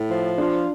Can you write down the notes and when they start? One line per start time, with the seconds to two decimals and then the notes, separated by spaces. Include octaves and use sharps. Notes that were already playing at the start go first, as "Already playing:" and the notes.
Already playing: A2 E4
0.11 F3
0.37 D4 F4